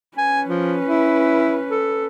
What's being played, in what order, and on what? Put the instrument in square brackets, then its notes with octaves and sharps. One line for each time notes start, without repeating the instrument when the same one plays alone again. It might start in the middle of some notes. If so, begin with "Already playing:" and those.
[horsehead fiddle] C#4 B4 [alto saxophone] G#5
[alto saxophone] F3
E4
A4